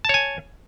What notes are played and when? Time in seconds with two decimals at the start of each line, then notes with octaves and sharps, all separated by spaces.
0.05 A5
0.09 C#5
0.14 G#5